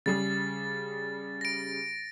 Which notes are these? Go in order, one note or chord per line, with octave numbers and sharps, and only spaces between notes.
C#3 G3 G#4 A6
A#6 D7